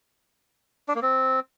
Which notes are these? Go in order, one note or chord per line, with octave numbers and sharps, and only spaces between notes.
D4
A#3
C4